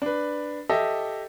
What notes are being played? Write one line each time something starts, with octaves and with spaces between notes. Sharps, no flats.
D4 B4
G4 A4 D#5 E5